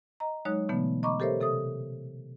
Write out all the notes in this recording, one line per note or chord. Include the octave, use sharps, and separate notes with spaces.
D#5 A#5
F#3 G#3 D#4 C#5 F#6
B2 D3 E3 F#3 A3 B3
D#5 A#5 B5 C#6 D6
G4 A4 A#4 C5 C#5 E5
C3 A4 E5 D#6